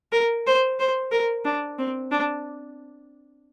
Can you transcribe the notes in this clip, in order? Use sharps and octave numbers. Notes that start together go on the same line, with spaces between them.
A#4
C5
C5
A#4
D4
C4
D4